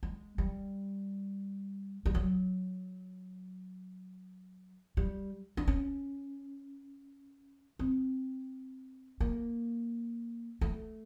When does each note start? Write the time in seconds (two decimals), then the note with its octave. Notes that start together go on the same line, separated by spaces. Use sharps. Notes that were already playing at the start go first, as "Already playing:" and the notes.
0.03 G#3
0.38 G3
2.06 G3
2.15 F#3
4.97 G3
5.57 D4
5.67 C#4
7.79 C4
9.20 A#3
10.61 A3